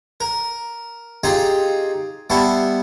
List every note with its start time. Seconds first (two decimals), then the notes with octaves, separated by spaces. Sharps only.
0.20 A#4
1.24 C4 D#4 F4 G4 G#4 C6
2.30 G3 B3 E4 A5 C6 C#6